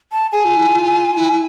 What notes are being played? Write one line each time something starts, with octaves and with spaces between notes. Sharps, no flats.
A5
G#4 G#5
F4
E4
F4
E4
E4